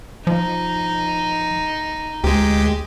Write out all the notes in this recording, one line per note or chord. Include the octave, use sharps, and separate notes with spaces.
F3 D#4
D2 G#3 G4